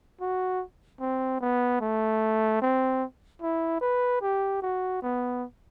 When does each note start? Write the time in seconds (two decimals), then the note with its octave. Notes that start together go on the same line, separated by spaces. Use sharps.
0.21 F#4
1.01 C4
1.41 B3
1.81 A3
2.62 C4
3.42 E4
3.81 B4
4.22 G4
4.62 F#4
5.03 B3